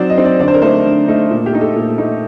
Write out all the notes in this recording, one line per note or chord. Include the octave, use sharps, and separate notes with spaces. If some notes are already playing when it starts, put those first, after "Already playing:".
Already playing: F#3 C4 D#4 C5 D5
D#5
C4 D#4
D5
D3 D5
C5
A#4
A3 D#4 C5
D3
A3 D#4
A#2
G4
A3 D#4
A4
A#2
A3 D#4